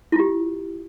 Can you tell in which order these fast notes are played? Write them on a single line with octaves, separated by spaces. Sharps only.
E4 F4 G4